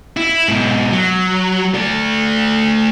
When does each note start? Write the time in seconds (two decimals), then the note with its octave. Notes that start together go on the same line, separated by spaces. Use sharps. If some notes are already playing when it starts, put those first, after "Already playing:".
0.17 E4
0.48 G#2 B2
0.93 F#3
1.74 A3 D5